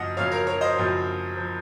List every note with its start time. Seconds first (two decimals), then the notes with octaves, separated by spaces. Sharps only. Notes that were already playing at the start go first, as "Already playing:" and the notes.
Already playing: F#1 F#2 F3 D#5 F#5
0.17 F#1 F#2 F3 C#5 F5
0.32 A#4 C#5
0.47 A#4 C#5
0.61 C5 D#5
0.76 F#1 F#2 F3
1.37 F3